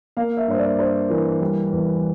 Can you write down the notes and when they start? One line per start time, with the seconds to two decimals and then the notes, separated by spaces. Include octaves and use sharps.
0.17 A#3 F5
0.37 E5
0.47 G2 C5
0.58 D5
0.79 D4 C5
1.10 E3 A#4
1.41 G3
1.72 E2